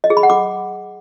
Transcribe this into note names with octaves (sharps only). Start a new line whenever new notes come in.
D#5
G#4
B5
F#5
D6